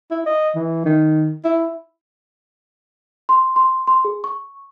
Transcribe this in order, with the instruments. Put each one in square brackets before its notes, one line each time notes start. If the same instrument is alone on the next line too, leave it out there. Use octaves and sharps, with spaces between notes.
[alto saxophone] E4
D#5
E3
D#3
E4
[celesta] C6
C6
C6
G#4
C#6